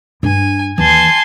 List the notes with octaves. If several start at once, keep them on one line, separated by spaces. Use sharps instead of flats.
G2 D4 G#5
D#2 E3 G#5 A5 C6